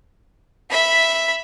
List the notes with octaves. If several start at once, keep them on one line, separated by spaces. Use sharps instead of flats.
E5 B5